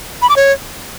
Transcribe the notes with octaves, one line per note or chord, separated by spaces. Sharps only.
B5
D6
C#5